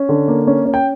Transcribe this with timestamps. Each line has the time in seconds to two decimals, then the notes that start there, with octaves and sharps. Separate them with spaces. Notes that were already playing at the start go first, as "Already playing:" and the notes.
Already playing: C#4
0.09 D3
0.28 A#3
0.47 C#4
0.65 C#4
0.74 G5